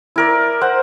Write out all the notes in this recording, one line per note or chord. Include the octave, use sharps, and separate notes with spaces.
E4 A#4 D5
C5 F#5